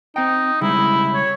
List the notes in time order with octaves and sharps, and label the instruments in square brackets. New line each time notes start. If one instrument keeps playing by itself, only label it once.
[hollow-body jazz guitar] C4 G5 [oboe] D#4
[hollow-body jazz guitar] C#3 G3 G#3 [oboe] E4
[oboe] C#5